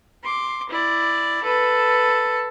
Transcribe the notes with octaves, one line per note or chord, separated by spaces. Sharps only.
C6 D6
E4 D5
A4 B4